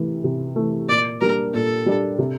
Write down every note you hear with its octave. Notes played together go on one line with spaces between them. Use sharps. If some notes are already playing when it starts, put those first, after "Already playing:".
Already playing: C3 E3 A3
C3
E3 A3
A#2 D5
G3 A#3 D4 A#4
A#2 A4
G3 A#3 D4
C3